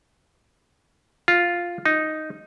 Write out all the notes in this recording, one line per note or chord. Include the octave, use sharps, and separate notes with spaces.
F4
D#4